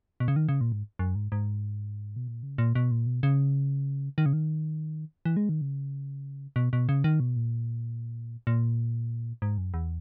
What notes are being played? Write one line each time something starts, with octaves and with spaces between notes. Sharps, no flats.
B2
C#3
D#3
C#3
A#2
G#2
F#2
G#2
G#2
B2
A#2
C#3
A#2
B2
A#2
B2
C#3
D#3
C#3
D#3
E3
G#3
D#3
C#3
B2
B2
C#3
D#3
B2
A#2
A#2
G#2
F#2
E2